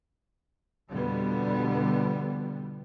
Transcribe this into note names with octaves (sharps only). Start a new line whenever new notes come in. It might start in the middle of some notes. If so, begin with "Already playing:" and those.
F2 B2 D3 F3 G3 B3